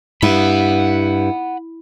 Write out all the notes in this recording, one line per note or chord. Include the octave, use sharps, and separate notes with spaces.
G2 E4 F#5 B5